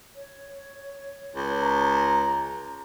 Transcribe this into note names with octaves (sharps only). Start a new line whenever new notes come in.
C#5
C#2
A#5